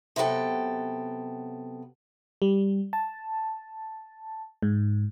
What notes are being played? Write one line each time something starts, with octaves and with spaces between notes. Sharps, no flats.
C3 F#3 B3 A4 G5
G3
A5
G#2